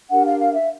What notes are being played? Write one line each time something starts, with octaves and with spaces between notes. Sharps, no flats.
D4 G4 A#4 F#5
F5
F5
E5